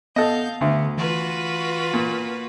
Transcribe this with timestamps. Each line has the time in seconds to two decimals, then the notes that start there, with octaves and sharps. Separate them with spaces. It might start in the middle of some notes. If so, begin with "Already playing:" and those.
0.16 B3 A4 D#5 F5 G6
0.61 D2 D3 B3
0.98 E3 F4 F#4 B4
1.93 A#2